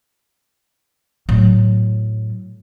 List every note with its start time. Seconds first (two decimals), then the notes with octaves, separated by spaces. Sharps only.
1.29 A2 F#3